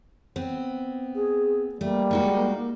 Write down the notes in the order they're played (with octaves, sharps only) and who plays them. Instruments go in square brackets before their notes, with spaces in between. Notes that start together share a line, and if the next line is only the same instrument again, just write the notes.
[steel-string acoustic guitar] B3 C4
[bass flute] G#4
[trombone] G3 [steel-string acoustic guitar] A3 [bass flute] A#3
[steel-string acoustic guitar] G#3 D#4 F#4